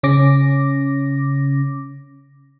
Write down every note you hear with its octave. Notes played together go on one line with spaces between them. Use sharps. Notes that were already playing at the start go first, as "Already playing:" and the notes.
C#3 C#4 D6 A#6